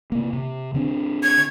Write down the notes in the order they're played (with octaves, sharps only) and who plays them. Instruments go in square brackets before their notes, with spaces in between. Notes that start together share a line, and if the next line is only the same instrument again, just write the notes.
[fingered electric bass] C3 A#3
C3
D3 C4 D4
[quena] G#6